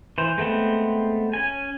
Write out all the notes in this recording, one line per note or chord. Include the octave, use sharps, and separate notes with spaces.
E3 C5
G#3 A3 B3 C4
C#4 G#5